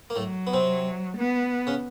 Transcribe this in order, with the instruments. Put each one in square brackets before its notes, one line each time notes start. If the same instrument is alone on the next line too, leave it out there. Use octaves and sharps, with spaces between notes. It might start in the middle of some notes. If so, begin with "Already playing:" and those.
[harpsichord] A#3
[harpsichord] A2 A3 [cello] F#3
[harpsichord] B3
C3 C4
[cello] B3
[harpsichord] C#3 C#4